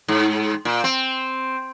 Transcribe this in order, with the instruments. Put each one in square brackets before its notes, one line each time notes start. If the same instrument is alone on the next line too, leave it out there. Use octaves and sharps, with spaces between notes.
[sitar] G#2
A#2
C4